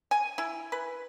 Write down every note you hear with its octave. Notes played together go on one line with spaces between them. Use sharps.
G#5
E4
B4